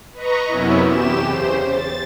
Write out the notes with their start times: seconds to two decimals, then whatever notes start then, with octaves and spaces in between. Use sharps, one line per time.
0.13 B4 D#5 A#5 C#6
0.48 F#2 C3 B3 C#4 E4
0.87 E2 G4 E7
1.26 C#3 C5
1.68 A6